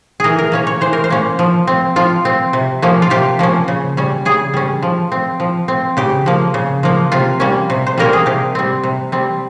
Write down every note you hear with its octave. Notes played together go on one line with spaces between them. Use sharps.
E3 G#4 A#4
A#4
A#3 C#4 C#5
C#5
E3 C5
A#4
C5
A#3 C#4
F3
C4
F3 F4
C4
C3
F3 A#3 C#4
F4
C3 G4
F3 A#3 C#4
C#3
G3 C#4
C#3 G#4
G3 C#4
F3
C4
F3
C4
C#3 G4
F3 A#3
C#3
F3 A#3
C3 F4
G3 A#3 C#4
C3
C5
G3 A#3 C#4 A#4
G#4
C3 G4
G3 C4
C3
G3 C4